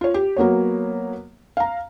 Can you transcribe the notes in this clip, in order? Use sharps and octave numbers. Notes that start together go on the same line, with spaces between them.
F4 C#5
G4
F#3 A#3 B3 C#5
F5 A#5